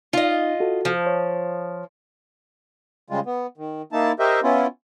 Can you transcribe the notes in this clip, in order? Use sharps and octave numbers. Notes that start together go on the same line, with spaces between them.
D#4 F4 D#5
F#4 A4
F3
C#5
C#3 G3 G#3 F4
B3
D#3
A#3 D#4 E4 A5
G4 A#4 C5 D#5 E5
B3 C#4 E4 F4